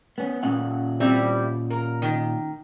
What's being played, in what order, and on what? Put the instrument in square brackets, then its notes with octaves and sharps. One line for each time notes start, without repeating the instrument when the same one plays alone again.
[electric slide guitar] B3 C#4
A#2 C#4 F#5
[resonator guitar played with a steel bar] G3 C4 E4
A#4
D#3